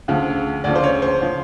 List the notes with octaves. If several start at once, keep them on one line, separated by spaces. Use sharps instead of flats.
D2 C#3 F3
D2 C#3 F3 D5
C5
C#5
C5
C#3 F3